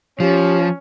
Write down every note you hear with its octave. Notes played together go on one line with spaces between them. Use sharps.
F3 C#4 G4